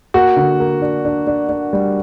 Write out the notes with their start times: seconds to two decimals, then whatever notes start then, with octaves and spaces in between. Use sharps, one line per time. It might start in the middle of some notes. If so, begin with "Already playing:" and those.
0.14 A#3 F#4
0.36 D3
0.60 A#3
0.82 D4
1.05 D4
1.27 D4
1.49 D4
1.73 G3